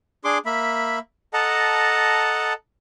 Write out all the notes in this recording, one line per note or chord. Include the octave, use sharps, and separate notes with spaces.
D4 G#4 C6 D6
A#3 E5 B5
A4 D#5 F#5 A5 A#5